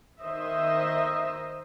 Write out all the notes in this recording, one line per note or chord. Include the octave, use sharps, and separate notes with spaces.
D#3 C5 D#5 E5